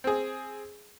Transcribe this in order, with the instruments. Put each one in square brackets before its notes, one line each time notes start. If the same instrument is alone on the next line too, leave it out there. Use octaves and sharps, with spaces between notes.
[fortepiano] C4 G#4